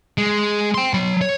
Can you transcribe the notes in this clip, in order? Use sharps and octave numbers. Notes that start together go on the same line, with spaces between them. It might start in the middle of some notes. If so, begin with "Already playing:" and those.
G#3
G5 C6
F#3 B5
C#5